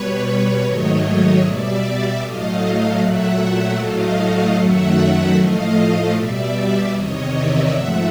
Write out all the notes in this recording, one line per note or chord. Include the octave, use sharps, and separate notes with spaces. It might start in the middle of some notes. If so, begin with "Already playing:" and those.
Already playing: B2 G3 B4 C#5
G#2 D#3 F#3 A3 C#5 D#5
B2 G3 D5 E5
A2 F#3 A3 D#5 F5
A#2 F#3 A3 E5 F#5
A2 F#3 A3 D#5 F5
F#2 D#3 F#3 A3 E5 F#5
A2 F3 A3 D#5 F5
B2 G3 D5 E5
E2 C3 D#3 C#5 D#5
D5 E5
G#2 F3 A3 E5 F#5